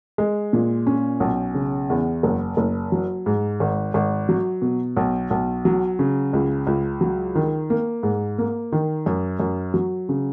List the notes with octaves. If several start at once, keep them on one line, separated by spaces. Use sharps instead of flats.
G#3
A#2
C#4
B1
C#3
E2
F#1
F#1
F#3
G#2
G#1
G#1
F#3
B2
B1
B1
F#3
C#3
C#2
C#2
F#3
D#3
A#3
G#2
A#3
D#3
F#2
F#2
F#3
C#3